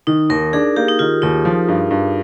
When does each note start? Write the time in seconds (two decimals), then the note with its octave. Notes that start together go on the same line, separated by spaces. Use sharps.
0.07 D#3 D#4
0.30 D#2 A#4
0.53 D4 G#4
0.76 A#3 G4
0.88 D#4
0.99 D#3 F4
1.22 D#2 D#4
1.45 F3
1.68 G2
1.91 G2